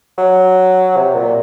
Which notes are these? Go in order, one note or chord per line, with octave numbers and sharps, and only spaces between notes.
F#3
C3
A#2